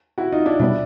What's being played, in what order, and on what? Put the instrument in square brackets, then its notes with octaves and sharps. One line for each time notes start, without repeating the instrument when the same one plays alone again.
[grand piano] E4 F#4
D#4 F4
D4 E4
[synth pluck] B2 G3 B3 [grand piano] D4 E4